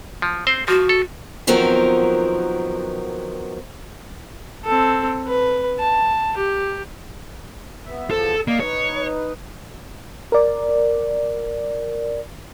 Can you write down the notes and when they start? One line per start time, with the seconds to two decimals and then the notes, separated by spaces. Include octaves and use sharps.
0.22 F3
0.47 C4 C5
0.68 F3 F#4
0.89 A4
1.47 D#3 F3 F#3 B3 C4 A#4
4.65 C4 A4
5.27 B4
5.80 A5
6.37 G4
7.86 B3 E5
8.11 E2 F3 A4 C5
8.48 A#3 D5 D#5
8.60 D#4 B4 C#5
10.32 A#4 D5